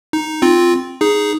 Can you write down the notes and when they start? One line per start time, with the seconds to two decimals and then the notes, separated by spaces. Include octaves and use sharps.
0.13 D#4
0.42 C4 F4
1.01 D#4 G#4